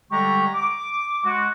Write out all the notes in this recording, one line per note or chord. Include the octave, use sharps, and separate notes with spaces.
D3 G3 G#3 G4 A#5 C#6
D6
G#3 F#4